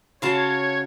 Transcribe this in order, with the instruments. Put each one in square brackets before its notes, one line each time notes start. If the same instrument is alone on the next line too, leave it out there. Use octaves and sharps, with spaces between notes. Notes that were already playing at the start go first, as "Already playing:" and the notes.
[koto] C#3 F5 A5 [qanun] F#4 A#5 C6 [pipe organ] C#5